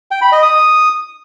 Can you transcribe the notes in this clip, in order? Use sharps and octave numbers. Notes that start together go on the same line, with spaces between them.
G5
B5
D#5
D#6